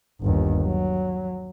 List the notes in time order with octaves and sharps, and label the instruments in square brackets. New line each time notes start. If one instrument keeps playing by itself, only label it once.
[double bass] G1 D#2
F#3